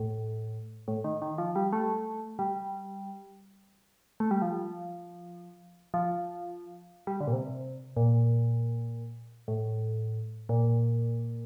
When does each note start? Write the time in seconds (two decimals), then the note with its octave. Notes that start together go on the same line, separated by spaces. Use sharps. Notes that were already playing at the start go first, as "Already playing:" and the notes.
Already playing: A2
0.88 A2
1.04 D#3
1.22 D#3
1.38 F3
1.56 G3
1.73 A3
2.39 G3
4.20 A3
4.31 G3
4.42 F3
5.94 F3
7.07 G3
7.21 D3
7.27 A#2
7.33 C3
7.97 A#2
9.48 A2
10.49 A#2